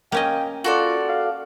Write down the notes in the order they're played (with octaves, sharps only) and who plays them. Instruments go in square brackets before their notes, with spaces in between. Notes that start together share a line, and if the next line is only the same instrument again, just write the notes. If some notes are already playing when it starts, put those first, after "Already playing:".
[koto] A#3 C#4 D#5 [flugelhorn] G5
[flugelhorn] F4 [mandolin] F#4 A4 D5
[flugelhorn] F5